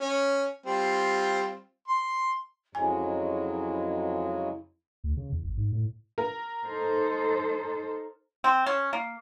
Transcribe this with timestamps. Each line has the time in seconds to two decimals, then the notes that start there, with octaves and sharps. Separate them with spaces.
0.01 C#4
0.66 G3 C4 F4
1.88 C6
2.75 F2 C#3 F#3 G#3 E4 G#5
5.04 D2
5.17 C#3
5.32 E2
5.45 G#1
5.57 G#2
5.72 A2
6.18 A#4
6.65 D#4 A4 C5
8.44 C4
8.66 C#4
8.93 A#3